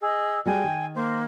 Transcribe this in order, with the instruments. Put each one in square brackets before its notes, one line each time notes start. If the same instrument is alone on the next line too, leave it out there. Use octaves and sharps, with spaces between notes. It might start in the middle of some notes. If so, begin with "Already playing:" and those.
[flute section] G#4 E6 [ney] D#5
[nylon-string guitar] G3 F#4 G#4 [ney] G5 [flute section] G#5
[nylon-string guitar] D#3
[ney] A#3 [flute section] C5